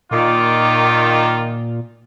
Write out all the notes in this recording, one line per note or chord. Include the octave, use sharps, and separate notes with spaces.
A#2 D#3 F4 D6